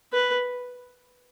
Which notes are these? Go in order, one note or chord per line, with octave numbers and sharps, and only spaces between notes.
B4